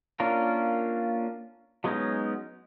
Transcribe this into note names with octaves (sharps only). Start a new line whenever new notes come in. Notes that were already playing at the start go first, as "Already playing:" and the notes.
A#3 C#4 D4 F4 A#4
F#3 G#3 B3 C#4 D#4